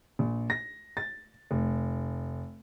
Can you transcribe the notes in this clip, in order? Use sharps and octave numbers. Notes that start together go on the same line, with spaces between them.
A#1
A#6
A6
F1